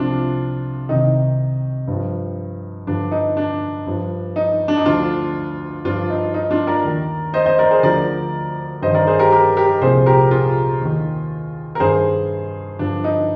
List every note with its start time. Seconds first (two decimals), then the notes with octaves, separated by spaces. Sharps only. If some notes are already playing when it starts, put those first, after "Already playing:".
Already playing: C2 C3 F3 D4 F4
0.89 C2 C3 D#3 D#4
1.88 G2 F3
2.87 G2 D3 F3 D4
3.12 D#4
3.37 D4
3.86 G2 F3
4.36 D#4
4.68 D4
4.77 D#4
4.86 D2 D3 F3 D4 F4
5.85 G2 F3 D4 F4
6.10 D#4
6.34 D#4
6.51 D4 F4
6.67 A#4 D5
6.84 D#2 D#3
7.34 C5 D#5
7.46 C5 D#5
7.59 A#4 D5
7.71 G#4 C5
7.83 D2 D3 F3 A#4 D5
8.82 G2 D#3 C5 D#5
8.95 A#4 D5
9.07 G#4 C5
9.19 G4 A#4
9.32 G4 A#4
9.57 G4 A#4
9.81 C2 A#2 F3 G#4 C5
10.06 G4 A#4
10.31 F4 G#4
10.81 D#2 D#3
11.75 A#4
11.80 G2 D#3 G#4 C5
12.79 G2 D3 F3 D4
13.04 D#4